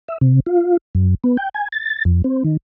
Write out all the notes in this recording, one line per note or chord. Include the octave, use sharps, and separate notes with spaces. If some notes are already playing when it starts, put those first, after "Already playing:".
E5
C3
F4
F#2
B3
G5
G#5
A6
F2
C4
D#3